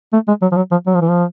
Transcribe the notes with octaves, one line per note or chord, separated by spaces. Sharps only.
A3
G#3
F#3
F3
F#3
F3
F#3
F3
E3
F3